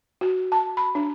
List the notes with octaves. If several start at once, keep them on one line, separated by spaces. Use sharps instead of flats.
F#4
A5
B5
D4